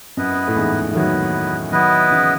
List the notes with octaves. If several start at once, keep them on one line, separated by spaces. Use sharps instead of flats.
F#2 B3 E4 B4 D#5
A2
E2 G#2
E3
D#3 F#3 B3 E4 B4 D#5
D#3 F#3 B3 E4 B4 D#5
C#3 E3